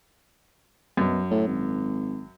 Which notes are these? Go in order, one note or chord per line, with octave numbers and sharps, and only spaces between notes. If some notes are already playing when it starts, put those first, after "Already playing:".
F#2 B2
A2
G#1